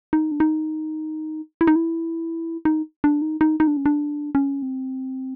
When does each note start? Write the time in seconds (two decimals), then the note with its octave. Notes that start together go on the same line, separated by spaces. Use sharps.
0.13 D#4
0.32 D4
0.40 D#4
1.61 E4
1.67 D#4
1.76 E4
2.65 D#4
3.04 D4
3.22 D#4
3.41 D#4
3.60 D#4
3.67 D4
3.77 C#4
3.86 D4
4.35 C#4
4.62 C4